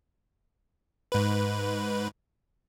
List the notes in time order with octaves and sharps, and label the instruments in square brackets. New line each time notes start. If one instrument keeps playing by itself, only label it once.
[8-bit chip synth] G#2 B4